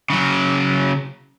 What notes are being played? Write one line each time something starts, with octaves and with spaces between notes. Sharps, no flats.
C#3 F#3